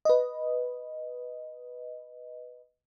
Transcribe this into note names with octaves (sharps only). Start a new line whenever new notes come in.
B4 D#5